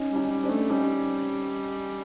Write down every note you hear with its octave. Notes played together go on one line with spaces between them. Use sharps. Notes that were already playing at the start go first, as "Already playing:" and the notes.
Already playing: C#4 D#4
G3
C#4 D#4
G3
C4 D4
A3
G3 C#4 D#4